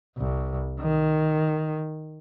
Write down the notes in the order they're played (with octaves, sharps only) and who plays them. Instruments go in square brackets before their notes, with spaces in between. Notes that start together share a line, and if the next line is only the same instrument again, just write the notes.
[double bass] C2
D#3